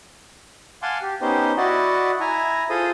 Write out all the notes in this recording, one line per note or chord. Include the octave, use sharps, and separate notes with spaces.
F5 F#5 G#5 A5 C6 D6
G4
B3 C#4 D#4 G4 C5
E4 F#4 D5 D#5 F#5
E4 G#5 A#5
F4 G#4 A4 C5 D#6